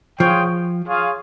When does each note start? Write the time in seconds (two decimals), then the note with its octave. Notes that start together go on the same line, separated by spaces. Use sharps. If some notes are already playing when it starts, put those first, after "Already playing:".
0.19 F3 F4 G#4 C#5 G5
0.87 F4 G#4 C#5 F5